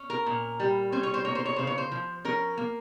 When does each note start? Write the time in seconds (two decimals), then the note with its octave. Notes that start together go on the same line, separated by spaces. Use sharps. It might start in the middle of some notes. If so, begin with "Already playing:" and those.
Already playing: C#4
0.10 A#4
0.26 A#2
0.60 G3
0.92 C#4 C5
1.03 C#5
1.14 C5
1.25 A#3 C#5
1.35 C5
1.45 C#5
1.56 C#3 C5
1.67 C#5
1.78 C5
1.92 F3
2.25 C#4 A#4
2.57 A#3